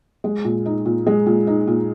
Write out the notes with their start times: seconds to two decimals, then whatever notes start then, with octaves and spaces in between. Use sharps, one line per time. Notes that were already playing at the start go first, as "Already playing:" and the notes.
0.24 G#3
0.45 A#2
0.66 D#4
0.86 A#2
1.07 G#3
1.26 A#2
1.47 D#4
1.67 A#2